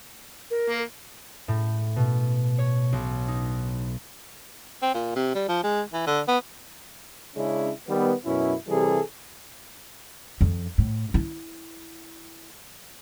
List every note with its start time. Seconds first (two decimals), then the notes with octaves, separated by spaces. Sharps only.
0.50 A#4
0.69 A#3
1.48 A2
1.96 B2
2.58 C#5
2.93 B1
3.28 D#4
4.83 C4
4.94 A#2
5.16 C3
5.35 G3
5.49 F3
5.64 G#3
5.93 E3
6.07 D3
6.28 B3
7.36 C#3 G#3 C#4 D4 E4
7.89 D#3 G3 B3
8.26 F#2 B2 C#4 E4
8.68 C3 E3 G3 G#4 A4
10.41 F2
10.78 A2
11.14 E4